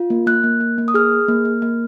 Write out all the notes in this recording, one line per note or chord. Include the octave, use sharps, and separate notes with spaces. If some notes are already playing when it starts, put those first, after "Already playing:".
Already playing: F4
A#3
A#3 F#6
A#3
A#3
A#3
D#6
G#4 F6
G#4
A#3
A#3
A#3